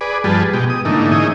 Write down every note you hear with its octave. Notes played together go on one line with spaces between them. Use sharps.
G#4 B4 D5
G2 F3 G3 G#4 B4 A5
B2 G#3 G4
D#6
G#2 D3 E3 A3 A#3 D#4
C#4 D#4 E4 G#4 D#5